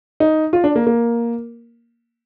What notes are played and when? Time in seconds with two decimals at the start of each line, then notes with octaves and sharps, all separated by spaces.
0.20 D#4
0.53 F4
0.64 D4
0.76 A#3
0.87 A#3